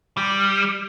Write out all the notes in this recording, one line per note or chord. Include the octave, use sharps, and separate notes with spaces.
G3